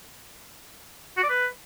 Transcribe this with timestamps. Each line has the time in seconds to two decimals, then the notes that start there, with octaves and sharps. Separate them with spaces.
1.17 F#4
1.23 D5
1.30 B4